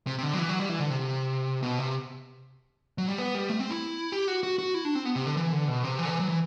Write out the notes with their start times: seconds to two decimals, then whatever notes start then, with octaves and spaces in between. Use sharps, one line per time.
0.07 C3
0.18 C3
0.23 D3
0.33 F#3
0.39 E3
0.49 F#3
0.59 G3
0.69 E3
0.80 D3
0.90 C3
1.63 B2
1.78 C3
2.98 F#3
3.08 G3
3.18 B3
3.35 G3
3.50 A3
3.60 C4
3.71 E4
4.12 G4
4.28 F#4
4.43 F#4
4.59 F#4
4.74 E4
4.85 D4
4.95 C4
5.05 B3
5.16 C3
5.27 D3
5.37 E3
5.52 D3
5.68 B2
5.83 C3
5.99 E3
6.05 D3
6.09 E3
6.20 F#3
6.29 E3